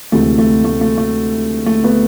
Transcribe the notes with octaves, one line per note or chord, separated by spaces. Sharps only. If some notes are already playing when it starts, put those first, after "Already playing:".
D2 C3 E3 G#3 A3
A3
A3
A3
A3
A3
A3 B3